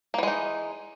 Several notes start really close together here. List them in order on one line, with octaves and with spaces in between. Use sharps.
A#3 E3 G#3 D#4